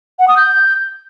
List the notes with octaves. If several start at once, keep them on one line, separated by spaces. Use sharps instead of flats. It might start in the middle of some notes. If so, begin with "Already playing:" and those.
F#5
D#6
G6